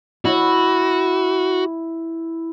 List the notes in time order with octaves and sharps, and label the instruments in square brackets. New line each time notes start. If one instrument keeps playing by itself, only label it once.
[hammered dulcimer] E4 [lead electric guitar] F#4